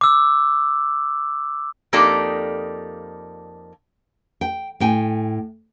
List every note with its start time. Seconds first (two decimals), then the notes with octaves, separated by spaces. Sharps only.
0.01 D6 E6
1.93 F2 A#3 D#4 G4 A4 D5
4.41 G5
4.80 A2 G5 G#5